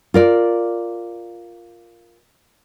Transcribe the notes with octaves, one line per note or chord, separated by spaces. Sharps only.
F4 A#4 D5